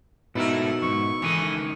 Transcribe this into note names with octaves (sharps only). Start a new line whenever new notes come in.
G#2 B2 D#4 E4 A4 A#4 E5
F2 G#2 C#6
C#2 D#3 E3 A4 G#5